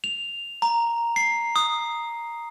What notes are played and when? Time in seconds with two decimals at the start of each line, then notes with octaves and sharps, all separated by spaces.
0.04 F7
0.62 A#5
1.16 C7
1.56 D#6